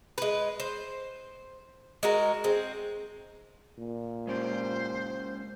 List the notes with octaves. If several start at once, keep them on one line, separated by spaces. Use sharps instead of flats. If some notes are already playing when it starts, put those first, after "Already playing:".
G#3 B4
C5
G#3 F#4 A#4
G#3 C4
A#2
G#3 C#4 G4 C5